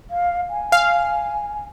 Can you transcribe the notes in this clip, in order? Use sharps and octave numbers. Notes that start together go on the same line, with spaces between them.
F5
G#5
F5